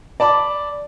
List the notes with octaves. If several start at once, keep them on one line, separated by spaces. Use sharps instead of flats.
D5 A5 B5 D6